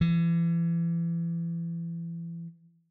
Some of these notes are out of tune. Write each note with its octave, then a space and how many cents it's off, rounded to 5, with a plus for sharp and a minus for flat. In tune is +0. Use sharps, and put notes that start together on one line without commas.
E3 +35